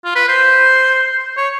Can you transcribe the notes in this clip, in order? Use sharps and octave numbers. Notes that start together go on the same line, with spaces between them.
F4
B4
C5
C#5